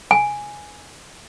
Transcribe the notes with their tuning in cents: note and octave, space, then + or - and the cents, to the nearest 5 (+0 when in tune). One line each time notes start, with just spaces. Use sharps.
G#5 +0